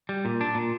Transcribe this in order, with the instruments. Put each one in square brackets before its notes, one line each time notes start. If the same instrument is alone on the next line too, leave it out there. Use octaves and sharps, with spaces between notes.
[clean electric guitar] G3
A#2
D4
A#2